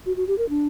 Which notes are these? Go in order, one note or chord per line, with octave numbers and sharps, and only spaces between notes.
F#4
F#4
G4
A#4
D4